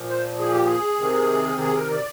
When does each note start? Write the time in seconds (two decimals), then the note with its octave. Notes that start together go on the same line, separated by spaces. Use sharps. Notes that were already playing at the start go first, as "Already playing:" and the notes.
Already playing: A#2 F3
0.09 C5
0.39 G#4
0.52 G4
0.65 G#4
1.00 C3 D#3
1.60 G#4
1.76 A#4
1.91 D5